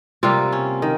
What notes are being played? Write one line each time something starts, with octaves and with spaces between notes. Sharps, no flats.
C3 G3 A#3 F4
C#4
D#3